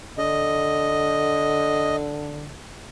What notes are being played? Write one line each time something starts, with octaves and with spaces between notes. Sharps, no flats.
D3 D#5